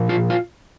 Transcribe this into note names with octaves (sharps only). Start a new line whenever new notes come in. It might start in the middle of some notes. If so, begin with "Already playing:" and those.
Already playing: A#2 F3
F4
F4